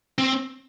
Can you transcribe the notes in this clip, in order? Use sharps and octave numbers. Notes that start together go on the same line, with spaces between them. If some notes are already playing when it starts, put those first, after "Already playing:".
C4